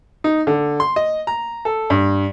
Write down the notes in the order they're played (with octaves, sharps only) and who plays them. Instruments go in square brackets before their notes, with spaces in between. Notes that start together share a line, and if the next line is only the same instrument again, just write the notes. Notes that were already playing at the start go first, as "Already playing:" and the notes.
[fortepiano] D#4
D3
C6
D#5
A#5
A4
G2